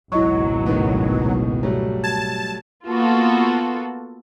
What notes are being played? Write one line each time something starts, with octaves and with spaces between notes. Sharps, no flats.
G#1 C#2 B2 F#3 E4 D#5 C#6
A2 D#3 B3
F#3 G3 A3
A5 G#6
A#3 B3 F4 F#4 A4